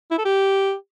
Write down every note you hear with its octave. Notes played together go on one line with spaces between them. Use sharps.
E4
A4
G4